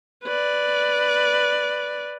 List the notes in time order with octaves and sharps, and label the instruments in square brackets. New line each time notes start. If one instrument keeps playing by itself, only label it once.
[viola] B4 D5